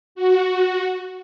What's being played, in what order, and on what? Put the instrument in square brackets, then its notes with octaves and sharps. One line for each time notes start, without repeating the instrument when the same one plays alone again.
[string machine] F#4